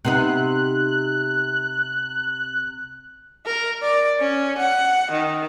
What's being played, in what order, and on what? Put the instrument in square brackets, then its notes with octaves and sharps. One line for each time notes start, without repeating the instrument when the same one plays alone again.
[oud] C3 B3 D#4 [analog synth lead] F#6
[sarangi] A#4
D5
C#4
F#5
D#3